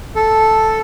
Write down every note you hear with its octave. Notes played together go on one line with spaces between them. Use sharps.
A4